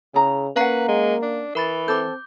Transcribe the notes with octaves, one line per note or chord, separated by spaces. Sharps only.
C#3 E4 G#4 A#5
A#3 C#4 B4 F5 F#5 A#5 C7
G#3
D4
E3 A#4 B5 A6
C4 A4 D6 G6